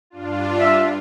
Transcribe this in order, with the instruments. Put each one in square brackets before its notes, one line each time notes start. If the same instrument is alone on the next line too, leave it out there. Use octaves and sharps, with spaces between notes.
[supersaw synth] G2 D4 F4
[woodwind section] E5